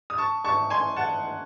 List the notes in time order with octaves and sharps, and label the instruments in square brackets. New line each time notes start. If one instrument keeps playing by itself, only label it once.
[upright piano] D#6
A5 C#6
A5 C#6
G#5 C6
F#5 A5